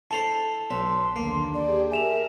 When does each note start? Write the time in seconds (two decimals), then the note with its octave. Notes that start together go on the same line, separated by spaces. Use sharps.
0.11 E4 A4 C5 A5 F7
0.70 B1 E5 C6
1.16 D#2 D3 A#3
1.54 G4 G#4 D5
1.91 A#4 E5 G#5 E7 F7